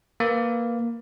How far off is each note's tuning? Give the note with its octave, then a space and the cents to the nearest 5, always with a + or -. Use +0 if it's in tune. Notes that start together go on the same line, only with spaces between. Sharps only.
A#3 +0 B4 +0